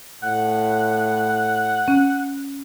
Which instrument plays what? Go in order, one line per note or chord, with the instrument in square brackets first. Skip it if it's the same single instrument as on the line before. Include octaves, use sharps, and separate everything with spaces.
[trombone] A2 [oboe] F#5
[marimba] C#4